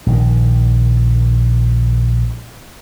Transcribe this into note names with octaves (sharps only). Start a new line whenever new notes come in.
A#1 D#3